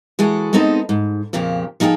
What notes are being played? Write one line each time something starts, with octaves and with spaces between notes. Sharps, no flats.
E3 G#3 F#4 G#4 A4
G#3 B3 C4 D#4 A4 D#5
G#2
F2 A#2 C#3 F3 G4
F3 D#4 F#4 G#4 A4 G5